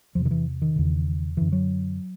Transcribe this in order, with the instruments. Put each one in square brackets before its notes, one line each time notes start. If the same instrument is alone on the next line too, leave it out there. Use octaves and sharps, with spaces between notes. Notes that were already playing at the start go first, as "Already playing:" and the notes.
[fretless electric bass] E2 C3 F3
D#3
E3
D#3
E2 C#3
F#2 D3 E3
F#3